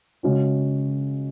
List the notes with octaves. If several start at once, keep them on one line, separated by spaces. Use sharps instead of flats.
C#3 G#3 C#4 F#4